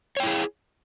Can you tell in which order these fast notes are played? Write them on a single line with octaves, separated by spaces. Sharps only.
C#5 G5 E4 G#4